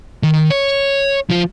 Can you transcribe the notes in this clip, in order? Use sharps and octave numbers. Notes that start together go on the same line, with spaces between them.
D#3
C#5
F3 F4